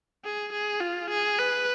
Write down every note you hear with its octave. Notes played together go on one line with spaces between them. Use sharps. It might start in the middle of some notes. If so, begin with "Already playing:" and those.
G#4
G#4
F4
G#4
B4